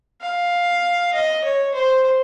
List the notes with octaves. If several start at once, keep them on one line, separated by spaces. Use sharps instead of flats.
F5
D#5
C#5
C5